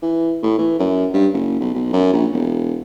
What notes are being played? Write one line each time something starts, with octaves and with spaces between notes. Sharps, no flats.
E3
A2
E3
F#2
G2
F#1
B1
B1
F#2
A#1
E1